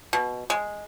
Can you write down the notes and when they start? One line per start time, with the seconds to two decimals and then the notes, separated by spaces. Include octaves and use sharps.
0.13 B2
0.50 G#3